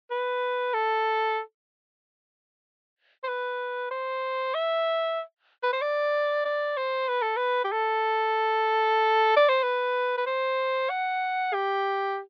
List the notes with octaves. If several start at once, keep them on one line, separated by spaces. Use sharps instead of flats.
B4
A4
C5
B4
C5
E5
B4
C5
D5
D5
C5
B4
A4
B4
G4
A4
D5
C5
B4
B4
C5
F#5
G4